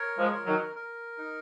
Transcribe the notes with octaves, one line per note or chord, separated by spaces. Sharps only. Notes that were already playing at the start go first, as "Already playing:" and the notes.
Already playing: A#4 C#5
F3 G#3
A#4
D#3 F#3
A#4
D#4